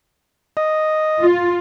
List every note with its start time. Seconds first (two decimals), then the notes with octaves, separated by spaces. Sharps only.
0.57 D#5
1.21 F4